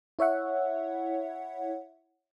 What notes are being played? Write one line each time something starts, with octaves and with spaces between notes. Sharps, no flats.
E4 C#5 E5 F#5